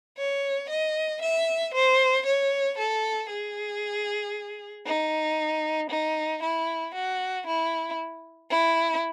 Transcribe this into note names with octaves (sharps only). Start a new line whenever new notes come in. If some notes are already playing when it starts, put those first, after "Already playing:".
C#5
D#5
E5
C5
C#5
A4
G#4
D#4
D#4
E4
F#4
E4
E4